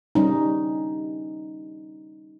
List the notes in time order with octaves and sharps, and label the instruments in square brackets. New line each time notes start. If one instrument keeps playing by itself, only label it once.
[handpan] G3 C#4 D#4